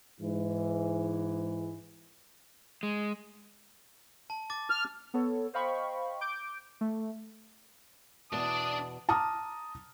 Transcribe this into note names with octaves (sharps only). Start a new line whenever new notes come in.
G#2 E3
G#3
A5
D6 A6
F6
B3 A4 C#5
C5 D#5 F5 G5 B5 C#6
D6 G6 D7
A3
E2 B2 D4 B4 D5 A5 D#6
A5 A#5 D6 D#6 F6